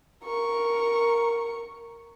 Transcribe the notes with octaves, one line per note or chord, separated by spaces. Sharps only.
A#4 C#6